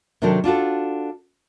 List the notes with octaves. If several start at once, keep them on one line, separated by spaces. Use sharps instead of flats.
C3 D#3 F#3 D4 A4 A#4
D4 F4 F#4 A4